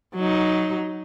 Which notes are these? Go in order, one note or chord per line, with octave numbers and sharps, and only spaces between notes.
F#3 D#4